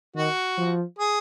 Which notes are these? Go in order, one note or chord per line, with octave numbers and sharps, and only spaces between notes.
D#3 F#4
F3
G#4